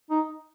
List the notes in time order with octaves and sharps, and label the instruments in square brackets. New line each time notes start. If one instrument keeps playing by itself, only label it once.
[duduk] D#4